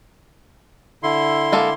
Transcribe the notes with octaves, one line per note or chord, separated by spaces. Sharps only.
D3 E4 C6
G#3 A#3 A4